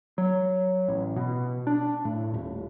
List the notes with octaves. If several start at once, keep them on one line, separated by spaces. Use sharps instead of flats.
F#3
A1
B2
D4
A2
D#1